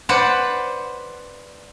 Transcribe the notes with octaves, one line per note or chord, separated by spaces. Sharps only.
B4 C5 D5 F#5 B5